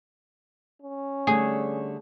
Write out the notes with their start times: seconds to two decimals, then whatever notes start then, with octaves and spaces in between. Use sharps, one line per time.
0.82 C#4
1.27 D3 G3 A3 G#4